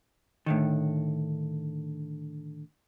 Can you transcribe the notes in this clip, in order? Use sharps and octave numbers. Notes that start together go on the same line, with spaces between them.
A2 D3 D#3